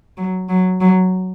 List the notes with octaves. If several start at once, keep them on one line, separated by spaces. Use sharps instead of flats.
F#3
F#3
F#3